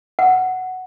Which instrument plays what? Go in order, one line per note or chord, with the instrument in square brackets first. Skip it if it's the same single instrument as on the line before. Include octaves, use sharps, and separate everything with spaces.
[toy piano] F#5